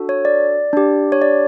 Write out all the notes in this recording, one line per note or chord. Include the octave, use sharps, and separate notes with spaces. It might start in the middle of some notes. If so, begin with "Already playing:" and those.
Already playing: D4 F#4 A4
C#5
D5
D4 G4
C#5
D5